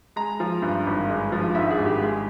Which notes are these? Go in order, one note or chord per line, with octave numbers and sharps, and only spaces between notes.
G#3 A#5
F3
G2
G#1
G#3
F3
G#2 E5
G#4
G#1
G4
G#3